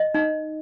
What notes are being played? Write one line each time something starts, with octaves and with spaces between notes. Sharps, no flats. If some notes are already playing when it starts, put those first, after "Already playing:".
Already playing: D#5
D#4